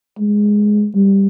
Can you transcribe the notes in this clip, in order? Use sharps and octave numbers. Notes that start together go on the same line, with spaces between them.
G#3
G3